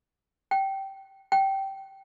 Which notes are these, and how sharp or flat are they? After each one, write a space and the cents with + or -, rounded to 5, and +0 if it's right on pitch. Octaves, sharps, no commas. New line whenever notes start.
G5 -15
G5 -15